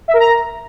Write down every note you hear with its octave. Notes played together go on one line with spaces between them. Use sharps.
E5
A#4
A#5